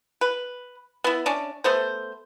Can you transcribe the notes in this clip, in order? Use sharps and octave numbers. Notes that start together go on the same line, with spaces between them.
B4
B3 E4
C#4 D4
A3 B3 C5